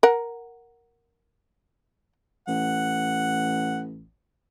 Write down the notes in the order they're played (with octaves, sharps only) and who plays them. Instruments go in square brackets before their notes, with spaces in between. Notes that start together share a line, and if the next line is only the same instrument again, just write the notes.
[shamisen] A#4 F#5
[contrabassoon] A1 [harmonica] F#5